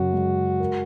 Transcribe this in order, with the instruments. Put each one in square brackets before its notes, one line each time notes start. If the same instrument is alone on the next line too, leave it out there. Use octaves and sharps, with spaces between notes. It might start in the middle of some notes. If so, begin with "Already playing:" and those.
Already playing: [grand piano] F#2 C#3 [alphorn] F#4
[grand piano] G#3
A#4